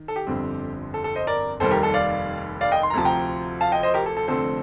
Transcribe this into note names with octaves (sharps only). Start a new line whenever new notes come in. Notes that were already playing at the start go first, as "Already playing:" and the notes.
Already playing: D#3
A4
G4
G1 F2 D3 G3 C4
A4
A4
C5 D#5
A#4 D5
F1 D#2 D#3 G3 A4 C5
G4 A#4
A4
D5 F5
D5 F5
D#5 G5
C6
A#5
D2 C3 F3 A5
G5 A#5
F5 A5
D#5 G5
C5 D#5
G4 A#4
A4
A4
F1 F2 D3 A3 C4 A4 C5